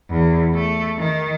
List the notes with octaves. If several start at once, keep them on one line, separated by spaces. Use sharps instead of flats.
E2
A3
D#3